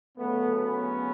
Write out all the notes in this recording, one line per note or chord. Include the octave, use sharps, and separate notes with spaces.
D2 C#3 F#3 A3 B3
B3 C#4